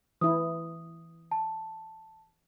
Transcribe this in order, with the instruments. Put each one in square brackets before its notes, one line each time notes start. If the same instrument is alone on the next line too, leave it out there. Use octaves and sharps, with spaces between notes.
[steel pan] E3 E4 [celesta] D#6
[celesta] A5